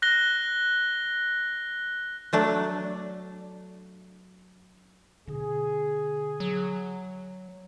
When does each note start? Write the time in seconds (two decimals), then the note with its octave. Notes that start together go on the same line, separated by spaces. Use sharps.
0.02 F#6 A#6 G7
2.33 F#3 A3 D4
5.28 B2 D3 G#4
6.40 F#3